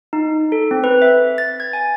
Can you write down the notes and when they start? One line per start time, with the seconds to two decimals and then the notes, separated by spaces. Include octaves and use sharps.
0.13 D#4
0.52 A4
0.71 C4
0.84 B4
1.02 E5
1.38 A6
1.60 G#6
1.73 G#5